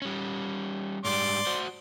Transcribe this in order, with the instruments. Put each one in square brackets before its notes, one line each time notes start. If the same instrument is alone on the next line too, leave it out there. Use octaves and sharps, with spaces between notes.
[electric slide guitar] G3 C#4
[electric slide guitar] G#2 G3 [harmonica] D5 C6 D6
[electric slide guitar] F#4 C5